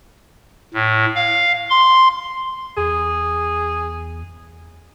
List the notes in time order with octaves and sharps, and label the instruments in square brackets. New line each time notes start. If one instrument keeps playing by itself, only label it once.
[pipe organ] A2
F5
C6
[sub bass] E2 [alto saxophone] G#4